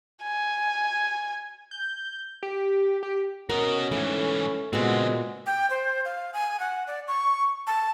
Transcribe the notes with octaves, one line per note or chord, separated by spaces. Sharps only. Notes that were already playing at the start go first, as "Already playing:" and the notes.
G#5
G6
G4
G4
C#4 F#4 A#4 D#5
G#2 E3 A3
C#2 A#2 G#3 B3 C4 F#4
G5
C5
F5
G#5
F#5
D5
C#6
A5